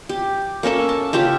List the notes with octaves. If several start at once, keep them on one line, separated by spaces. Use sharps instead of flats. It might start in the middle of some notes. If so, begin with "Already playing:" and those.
G4
A#3 C#4 A4 E5
A5
C#3 F4 G4 E5